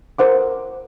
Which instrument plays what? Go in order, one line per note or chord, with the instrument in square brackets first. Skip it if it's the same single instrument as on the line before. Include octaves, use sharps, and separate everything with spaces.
[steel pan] A#4 C5 F#5 D6